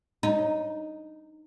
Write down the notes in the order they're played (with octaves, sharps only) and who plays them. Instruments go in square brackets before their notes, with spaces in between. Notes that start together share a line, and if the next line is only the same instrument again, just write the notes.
[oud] D#4